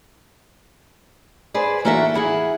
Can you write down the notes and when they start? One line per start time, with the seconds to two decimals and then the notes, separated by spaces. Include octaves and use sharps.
1.54 G#4 B4 C5 D5
1.85 E3 A#3 D4 F#4 A4 E5
2.14 E2 E4 G#4 F#5